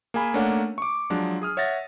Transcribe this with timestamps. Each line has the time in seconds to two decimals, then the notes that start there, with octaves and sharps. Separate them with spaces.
0.14 A#3 G#4 G#5 B5
0.34 A3 A#3 C#4 D4 C#5 F#5
0.78 C#6 D6
1.10 F3 F#3 G#3 D4
1.42 G#4 D#6 F6
1.57 C#5 E5 F#5 A6 A#6